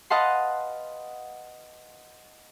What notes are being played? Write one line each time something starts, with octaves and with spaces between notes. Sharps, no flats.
B4 D#5 F5 F#5 A5 C6